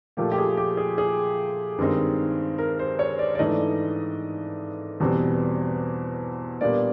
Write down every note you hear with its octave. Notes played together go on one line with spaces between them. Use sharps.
A#2 F3 A3 G4
G4
G#4
G4
G#4
G#4
G2 D#3 G#3 C4 D#4
A#4
C5
C#5
D5
D5
G#2 E3 A3 D4 D#5
E2 B2 G3 C4
A#2 G3 B3 D4 D5